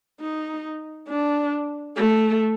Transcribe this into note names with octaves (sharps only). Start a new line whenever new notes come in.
D#4
D4
A3